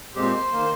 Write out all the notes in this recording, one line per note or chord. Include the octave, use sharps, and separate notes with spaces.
A#2 G#3 C4 G4 C5
D#3 A#3